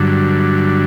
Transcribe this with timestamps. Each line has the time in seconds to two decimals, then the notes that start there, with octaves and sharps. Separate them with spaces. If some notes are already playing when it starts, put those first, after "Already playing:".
Already playing: G2 D3 F#3